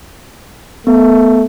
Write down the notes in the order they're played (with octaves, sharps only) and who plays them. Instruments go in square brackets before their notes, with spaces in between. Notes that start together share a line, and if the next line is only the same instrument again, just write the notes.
[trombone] A3 [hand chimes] B3